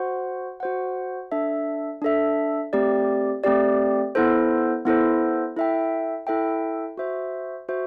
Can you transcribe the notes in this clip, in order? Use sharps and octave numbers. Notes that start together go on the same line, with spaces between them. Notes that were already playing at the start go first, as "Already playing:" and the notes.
Already playing: F#4 C5 F#5
F#4 C5 F#5
D4 A4 E5
D4 A4 E5
A3 C4 G4 D5
A3 C4 G4 D5
B3 E4 A4 C5
B3 E4 A4 C5
E4 A4 E5 G5
E4 A4 E5 G5
F#4 C5 E5
F#4 C5 E5